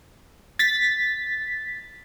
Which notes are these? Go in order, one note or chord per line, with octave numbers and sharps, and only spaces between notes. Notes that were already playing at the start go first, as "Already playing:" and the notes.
A6 B6